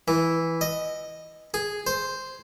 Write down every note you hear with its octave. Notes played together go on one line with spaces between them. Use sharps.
E3
D#5
G#4
C5